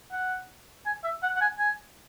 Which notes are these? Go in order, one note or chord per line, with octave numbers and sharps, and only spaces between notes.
F#5
G#5
E5
F#5
F#5
G#5
G#5